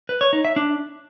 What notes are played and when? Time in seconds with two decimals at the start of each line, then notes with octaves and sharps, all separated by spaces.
0.09 B4
0.21 C#5
0.33 D#4
0.45 E5
0.56 D4